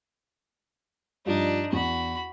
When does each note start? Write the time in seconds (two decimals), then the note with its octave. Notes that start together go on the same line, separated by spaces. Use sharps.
1.26 G2 F3 D4 D#4
1.72 E2 F#4 B5